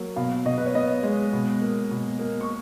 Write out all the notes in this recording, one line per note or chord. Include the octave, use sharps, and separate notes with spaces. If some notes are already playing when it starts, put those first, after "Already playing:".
Already playing: F#3 A#3
B2 F5
B2 D#5
B4
C#5
B3 D#5
G#3
B2
A#3
B2
A#3
C#6